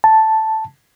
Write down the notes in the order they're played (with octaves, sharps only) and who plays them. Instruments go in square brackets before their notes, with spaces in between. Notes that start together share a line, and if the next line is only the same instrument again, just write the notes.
[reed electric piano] A5